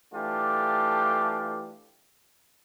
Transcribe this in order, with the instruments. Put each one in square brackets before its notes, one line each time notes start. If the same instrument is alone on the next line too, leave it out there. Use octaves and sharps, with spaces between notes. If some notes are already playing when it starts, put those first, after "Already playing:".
[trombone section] E3 A3 D4 F4 G4